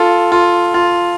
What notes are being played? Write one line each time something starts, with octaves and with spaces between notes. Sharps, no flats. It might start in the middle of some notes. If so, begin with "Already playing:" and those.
Already playing: F4 A4
F4
F4